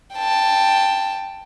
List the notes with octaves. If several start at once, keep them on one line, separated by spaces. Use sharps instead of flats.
G5 A5